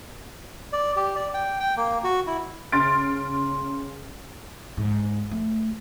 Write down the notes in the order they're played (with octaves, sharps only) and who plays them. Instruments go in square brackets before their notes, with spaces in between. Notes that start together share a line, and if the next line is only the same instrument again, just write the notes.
[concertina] D5
G4
D5
G5
G5
A#3
F#4
E4
[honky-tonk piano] C#3 C6 F6 A6 D7
[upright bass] G#2
A3